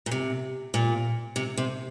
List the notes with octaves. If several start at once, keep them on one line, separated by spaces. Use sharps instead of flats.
A#2
C3
A#2
C3
C3